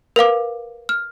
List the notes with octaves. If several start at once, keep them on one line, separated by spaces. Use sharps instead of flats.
A#4 B4 F5 D6
F6